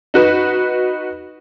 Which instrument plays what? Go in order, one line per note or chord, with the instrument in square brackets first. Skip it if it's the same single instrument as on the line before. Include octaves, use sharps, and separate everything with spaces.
[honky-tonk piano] D#4 F#4 B4